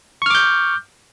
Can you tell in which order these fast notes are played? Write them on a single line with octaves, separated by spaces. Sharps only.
C#6 F6 D6 G6